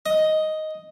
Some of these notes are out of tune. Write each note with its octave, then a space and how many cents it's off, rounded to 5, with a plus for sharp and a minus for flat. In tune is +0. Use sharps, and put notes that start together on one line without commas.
D#5 +5